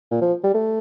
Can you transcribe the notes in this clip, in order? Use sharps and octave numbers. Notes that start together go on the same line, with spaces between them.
A#2
F3
G3
A3